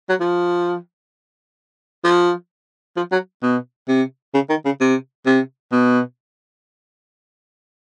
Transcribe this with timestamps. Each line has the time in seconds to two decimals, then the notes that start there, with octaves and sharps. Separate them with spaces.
0.09 F#3
0.20 F3
2.04 F3
2.97 F3
3.12 F#3
3.43 B2
3.88 C3
4.34 C#3
4.50 D#3
4.65 C#3
4.81 C3
5.26 C3
5.72 B2